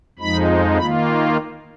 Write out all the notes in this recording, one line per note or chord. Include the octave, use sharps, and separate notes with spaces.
F2 F3 G#3 D#4 B5
D#3 A#3 F4 B5